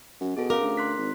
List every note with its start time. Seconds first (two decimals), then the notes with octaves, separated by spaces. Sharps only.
0.21 F#2
0.37 B2 G#4 A4
0.50 C#4 A#4 F5 D6
0.62 D2
0.77 C6 F#6 B6
0.97 G#1